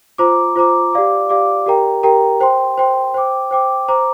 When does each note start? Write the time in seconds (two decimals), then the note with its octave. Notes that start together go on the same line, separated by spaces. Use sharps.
0.18 F4 C5 A#5 D6
0.56 F4 C5 A#5 D6
0.93 G4 D5 F5 D6
1.29 G4 D5 F5 D6
1.66 G4 A#4 G5 A#5
2.03 G4 A#4 G5 A#5
2.40 C5 G5 C6
2.78 C5 G5 C6
3.14 C5 G5 D6
3.51 C5 G5 D6
3.88 C5 A#5 D6